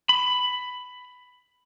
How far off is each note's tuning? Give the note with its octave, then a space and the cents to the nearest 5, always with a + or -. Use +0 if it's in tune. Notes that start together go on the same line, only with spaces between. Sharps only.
B5 +10